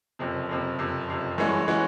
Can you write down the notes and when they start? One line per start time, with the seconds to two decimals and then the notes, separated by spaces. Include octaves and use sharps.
0.19 F#1 F2 C3
0.49 F#1 F2 C3
0.79 F#1 F2 C3
1.08 F#1 F2 C3
1.38 G2 E3 G#3 C#4 F#4
1.68 E3 G#3 C#4 F#4